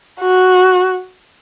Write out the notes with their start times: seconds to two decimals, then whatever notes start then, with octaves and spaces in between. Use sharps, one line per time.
0.21 F#4